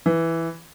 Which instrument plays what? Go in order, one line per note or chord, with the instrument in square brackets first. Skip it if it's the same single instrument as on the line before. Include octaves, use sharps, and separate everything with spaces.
[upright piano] E3